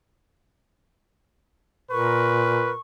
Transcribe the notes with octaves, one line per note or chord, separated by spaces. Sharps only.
A#2 A#4 B4 C#6